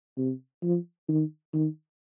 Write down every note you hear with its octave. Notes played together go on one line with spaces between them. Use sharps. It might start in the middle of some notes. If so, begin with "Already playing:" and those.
C3
F3
D#3
D#3